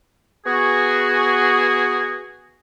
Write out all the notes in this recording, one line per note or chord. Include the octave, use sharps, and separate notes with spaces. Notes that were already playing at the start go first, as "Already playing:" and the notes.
B3 F#4 G#4